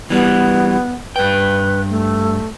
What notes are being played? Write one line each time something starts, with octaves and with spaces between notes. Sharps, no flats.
E3 G3 B3
G2 B4 G5
A3